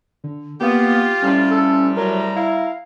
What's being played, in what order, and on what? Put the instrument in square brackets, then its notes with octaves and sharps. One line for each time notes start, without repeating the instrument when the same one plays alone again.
[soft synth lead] D3
[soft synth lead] A#3 [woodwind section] B3 [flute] F4 [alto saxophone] G4
[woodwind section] A2 C3 G3 [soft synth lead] C#4
[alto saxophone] A4
[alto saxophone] F#3 [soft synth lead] A#4 [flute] A#5
[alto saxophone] E4 [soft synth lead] F5